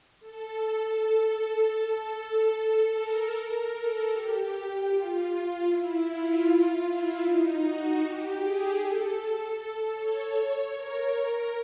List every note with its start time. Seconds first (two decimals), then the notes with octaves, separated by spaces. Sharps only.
0.20 A4
1.37 A4
2.92 A#4
3.32 A#4
3.71 A4
4.10 G4
4.88 F4
5.66 E4
6.05 F4
6.83 E4
7.22 D#4
7.61 F#4
7.99 G4
8.39 G#4
8.77 A4
9.95 C#5
10.73 A#4
11.11 A#4